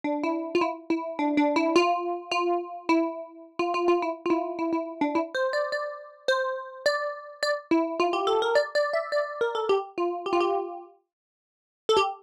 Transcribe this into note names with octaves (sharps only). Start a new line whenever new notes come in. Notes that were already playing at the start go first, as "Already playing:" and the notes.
D4
E4
F4
E4
E4
D4
D4
E4
F4
F4
E4
F4
F4
F4
E4
F4
E4
E4
E4
D4
E4
C5
D5
D5
C5
D5
D5
E4
F4
G4
A4
A#4
D5
D5
E5
D5
A#4
A4
G4
F4
G4
F4
G4
A4
G4